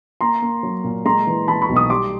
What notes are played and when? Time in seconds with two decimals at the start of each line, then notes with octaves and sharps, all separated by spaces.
0.21 A#3 A#5 C6
0.42 A#3
0.63 F#3
0.84 A#2
1.05 G#3 A#5 C6
1.27 E3
1.48 E3 A5 B5
1.62 B5 C#6
1.69 B1
1.76 C#6 D#6
1.90 G3 C6 D6